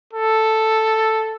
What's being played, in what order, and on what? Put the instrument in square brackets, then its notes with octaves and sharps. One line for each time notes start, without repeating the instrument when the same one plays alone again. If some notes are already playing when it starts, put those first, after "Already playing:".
[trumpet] A4